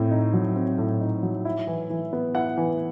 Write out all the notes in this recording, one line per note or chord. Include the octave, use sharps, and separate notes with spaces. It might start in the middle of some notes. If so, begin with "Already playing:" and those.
Already playing: A2 C4
D#4
F#3
C4
A2
D#4
F#3
E4
E3
E3
B3
E4 F#5
E3